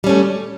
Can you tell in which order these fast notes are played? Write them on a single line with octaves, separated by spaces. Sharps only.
G3 C#4 A3